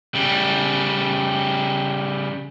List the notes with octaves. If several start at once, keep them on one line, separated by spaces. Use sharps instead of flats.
C#3 G3